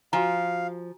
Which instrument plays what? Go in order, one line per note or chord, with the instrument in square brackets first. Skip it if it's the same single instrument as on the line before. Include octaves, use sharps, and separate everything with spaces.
[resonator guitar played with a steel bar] F3 [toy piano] F#4 G#5 A#5 [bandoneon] F5